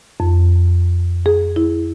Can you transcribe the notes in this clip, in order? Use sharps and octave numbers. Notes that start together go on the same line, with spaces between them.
F2
G#4
E4